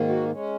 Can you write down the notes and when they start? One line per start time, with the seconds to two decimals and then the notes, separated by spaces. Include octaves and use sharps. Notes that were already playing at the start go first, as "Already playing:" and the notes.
Already playing: G#2 D#3 A#3
0.08 F#4
0.31 G#3 C#4